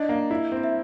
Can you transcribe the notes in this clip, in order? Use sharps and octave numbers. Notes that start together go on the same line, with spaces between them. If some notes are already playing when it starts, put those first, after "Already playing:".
Already playing: D4 D#5
A#3
E4
C4
E5